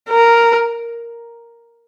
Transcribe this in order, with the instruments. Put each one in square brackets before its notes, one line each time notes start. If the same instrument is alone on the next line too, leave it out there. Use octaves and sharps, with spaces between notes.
[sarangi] A#4